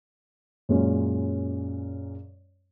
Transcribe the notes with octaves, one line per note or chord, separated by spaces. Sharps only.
F#2 A#2 G#3 C#4